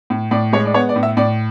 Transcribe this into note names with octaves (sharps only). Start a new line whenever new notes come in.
A2
A2 D5
G#3 C#5
D5
B3 C#5
D5
A2
E5
A2 D5